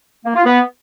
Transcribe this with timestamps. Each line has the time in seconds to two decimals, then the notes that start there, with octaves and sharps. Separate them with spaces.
0.24 A#3
0.35 F4
0.45 B3